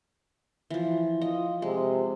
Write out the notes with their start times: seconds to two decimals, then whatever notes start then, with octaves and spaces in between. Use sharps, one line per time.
0.70 E3 F3
1.22 F4 D#5
1.62 C3 G#3